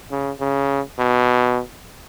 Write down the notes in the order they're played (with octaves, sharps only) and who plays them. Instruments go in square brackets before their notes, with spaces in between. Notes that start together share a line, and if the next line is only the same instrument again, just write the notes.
[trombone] C#3
C#3
B2